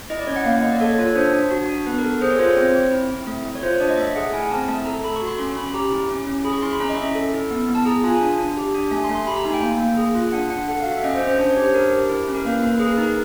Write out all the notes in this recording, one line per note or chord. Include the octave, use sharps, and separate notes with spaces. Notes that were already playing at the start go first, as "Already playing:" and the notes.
E4 D#5
D5
C#4 C#5
F#5
A#3 F5
A#3 D#5
D5
A4 C#5
F4 C#5
D4 C5
D4
F#4
D4
B3 B4
A#4
A4
G#4 C5
C#5
F4 C5
C#5
C4 C5
C4
E4
C4
A3
A3
C#5
F4 C5
C#5
D4 D5
D#5
A3 E5
G#4 F#5
E4 G#5
C4 A5
A3 A5
A4 A#5
A4 B5
C#6
F#4
C6
C#4 C6
C#4 B5
G4 A#5
E4
C#4
C#4
G#4 B5
C#6
E4 C6
B5
C#4 A#5
D#5
C#4 E5
A4
E4
B3
B3
A5
G#4 A#5
F4 G#5
D4
D4
G4
D4
A3 G#5
C6
A3
C6
G4 B5
A#5
D#4 G#5
G5
A#3
A#3
G#4
F4
D4 F#5
D4 F#5
A4 F#5
F5
F#4
E5
C#4 D#5
C5
C#4
C5
D4 C5
C#5
G4
C5
D4 A#4
G4
E4
C#4
A#4
A#3 B4
A#3 B4
G#4 B4
A#4
B4
D#4
A#4